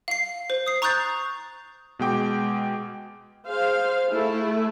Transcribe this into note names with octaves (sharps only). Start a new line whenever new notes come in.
F5 C7
C5
D#6 C7
A#5 C#6 D#6 F#6 G6 A6
B2 G#3 G5 D6
G#4 C5 F5
A3 E4 G#4